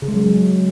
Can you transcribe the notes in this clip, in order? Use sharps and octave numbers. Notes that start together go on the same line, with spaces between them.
C#3
G#3
F#3
G#3
F#3